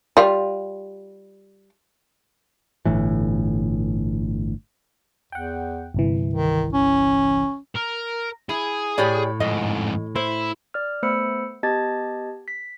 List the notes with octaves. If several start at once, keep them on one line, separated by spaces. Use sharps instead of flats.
G3 F4
G1 A2 E3
E2 F#5 G5
G1 C2 E3
D#3
C#4
A#4
E4 G#4
A2 G4 C#5 D5 B5
F2 G#2 D#5
E4 C5
D5 F6
A3 B3 C5 B5 E6 C#7
B3 G4 D#5 A5 G#6 A6
B6